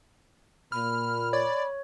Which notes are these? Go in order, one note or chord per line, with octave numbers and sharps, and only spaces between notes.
A#2 B5 F6
C#5 D5